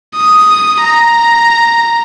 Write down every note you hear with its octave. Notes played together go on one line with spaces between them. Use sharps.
D#6
A#5